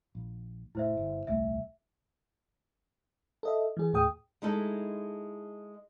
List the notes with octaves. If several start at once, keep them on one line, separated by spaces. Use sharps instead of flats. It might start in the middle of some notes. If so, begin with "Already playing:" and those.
A#1
F1 A2 E4 C5 E5
G1
D#1 C2 A3 E5
A4 D#5 E5
E3 G#4
D#2 A2 G#4 G5 D#6
G#3 D#4 E4 A4